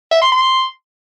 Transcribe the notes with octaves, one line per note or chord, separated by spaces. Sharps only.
E5
C6
C6